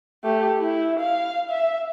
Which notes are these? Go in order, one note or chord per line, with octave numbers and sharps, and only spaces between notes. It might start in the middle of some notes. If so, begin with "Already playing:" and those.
A3 G4
E4
F5
E5